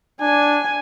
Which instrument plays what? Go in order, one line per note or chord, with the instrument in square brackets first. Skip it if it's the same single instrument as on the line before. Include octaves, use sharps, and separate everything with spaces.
[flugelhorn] D4 [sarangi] G#5